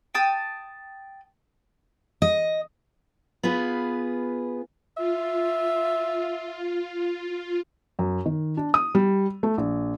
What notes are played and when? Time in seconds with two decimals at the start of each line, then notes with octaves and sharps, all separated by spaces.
0.15 G5 A5 D#6
2.22 D#5
3.43 B3 F4 G#4 B4
4.97 F4 E5
7.99 F#2
8.26 D#3
8.57 D4
8.74 D#6
8.95 G3
9.43 A3
9.58 A#1